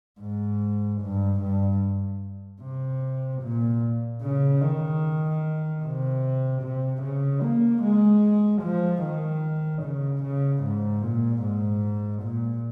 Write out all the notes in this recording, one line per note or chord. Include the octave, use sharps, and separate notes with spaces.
G#2
G2
G2
C3
A#2
C#3
D#3
C3
C3
C#3
A#3
G#3
F3
D#3
C#3
C#3
G#2
A#2
G#2
A#2